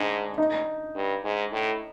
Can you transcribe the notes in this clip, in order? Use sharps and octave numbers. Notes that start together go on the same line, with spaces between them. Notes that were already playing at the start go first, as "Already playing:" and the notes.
Already playing: G#2 D4
D#4
G2
G#2
A2